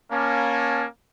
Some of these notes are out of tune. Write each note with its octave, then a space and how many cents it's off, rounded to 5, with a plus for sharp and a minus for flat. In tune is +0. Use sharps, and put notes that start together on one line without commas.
A#3 +20 C#4 +0 A5 +0